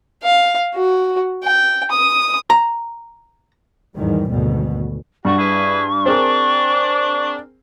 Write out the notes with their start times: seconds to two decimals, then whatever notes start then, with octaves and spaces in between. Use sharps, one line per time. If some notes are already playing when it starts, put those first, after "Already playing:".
0.23 F5
0.74 F#4
1.44 G5
1.91 D#6
2.50 A#5
3.96 E2 G#2 D#3 G3
4.29 G#1 D2 B2
5.25 G2 A3 F#4 C#6
5.38 E4 G#4 B4
6.06 C4 D4 G#4 A#4